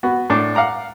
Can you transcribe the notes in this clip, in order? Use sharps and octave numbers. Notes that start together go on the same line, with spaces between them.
B3 F#4
A2 D4 D6
F5 F#5 A#5 D6